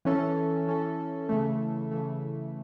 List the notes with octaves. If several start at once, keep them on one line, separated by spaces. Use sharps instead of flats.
E3 C#4 A4
E3 C#4 A4
C#3 E3 A3
C#3 E3 A3